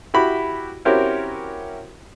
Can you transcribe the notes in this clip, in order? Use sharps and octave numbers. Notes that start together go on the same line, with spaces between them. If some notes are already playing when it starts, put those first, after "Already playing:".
E4 F#4 G4 B5
C4 C#4 E4 F#4 G4 A#4